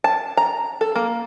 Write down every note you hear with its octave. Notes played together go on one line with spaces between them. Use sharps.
A5
A#5
A4
A#3